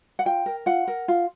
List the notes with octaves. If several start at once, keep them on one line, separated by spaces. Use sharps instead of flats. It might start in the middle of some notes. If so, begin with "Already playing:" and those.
F#5
F4 G5
A#4
F4 F#5
A#4
F4